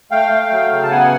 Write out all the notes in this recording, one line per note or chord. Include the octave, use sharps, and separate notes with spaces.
A3 F5 G5
A3
F#3
C#3
A5
B3 F#5 G#5